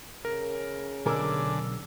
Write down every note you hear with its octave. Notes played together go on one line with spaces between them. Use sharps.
C#3 A#4
B1 D3 A#4 G#5 D6 E6